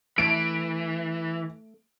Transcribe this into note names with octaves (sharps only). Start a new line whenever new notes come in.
E3 A3 D7